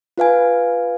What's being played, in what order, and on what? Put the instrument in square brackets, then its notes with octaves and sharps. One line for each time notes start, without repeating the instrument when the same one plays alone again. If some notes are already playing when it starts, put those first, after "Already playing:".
[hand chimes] F4 B4 F5 G#5